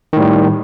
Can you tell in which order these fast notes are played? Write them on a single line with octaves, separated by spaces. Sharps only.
D#3 A2 G3